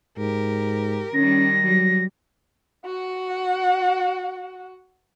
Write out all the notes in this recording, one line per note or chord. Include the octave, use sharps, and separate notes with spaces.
G#2 G4 A#4
D#3 G3 C#4 A#6
F#3 G3
F#4 F#5